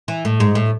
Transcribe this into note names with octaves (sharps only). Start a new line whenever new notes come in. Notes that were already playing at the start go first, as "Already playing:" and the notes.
E3
A2
G#2
A2